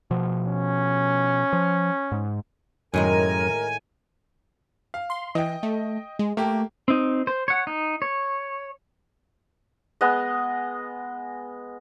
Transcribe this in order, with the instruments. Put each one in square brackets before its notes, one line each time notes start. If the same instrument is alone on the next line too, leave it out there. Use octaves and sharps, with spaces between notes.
[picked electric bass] B2 F3
[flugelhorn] C#4
[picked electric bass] F3
G#2
[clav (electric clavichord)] F#2 [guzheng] A2 D#3 G#3 [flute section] A#4 [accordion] G#5
[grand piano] F5
[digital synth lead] C6
[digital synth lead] E3 [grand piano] D#5 G5
[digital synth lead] A3
G#3
[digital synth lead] A3 [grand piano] A#3 G4
[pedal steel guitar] C4 D#4
C5
C#5 F#5
D#4
C#5
[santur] G#3 B3 D#5